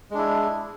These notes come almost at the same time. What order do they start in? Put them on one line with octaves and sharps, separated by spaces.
G#3 D4 E4